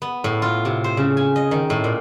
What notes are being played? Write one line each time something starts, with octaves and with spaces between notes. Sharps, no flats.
B3
A2
F4
C3
C5
C#3
G#5
D#5
D#3
A2
A#2